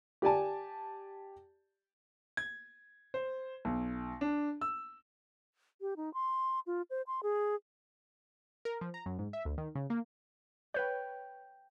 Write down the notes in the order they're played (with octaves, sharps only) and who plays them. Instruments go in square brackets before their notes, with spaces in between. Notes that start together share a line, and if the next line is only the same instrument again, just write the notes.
[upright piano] G4 D5 G#5 A5
[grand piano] G#6
C5
B1
D4
E6
[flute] G4
D#4
C6
F4
C5
C6
G#4
[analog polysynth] A#4
F3
A#5
F#2
G#2
E5
D2
D#3
C#3
A#3
[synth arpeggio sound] B4 C#5 [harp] G5 G6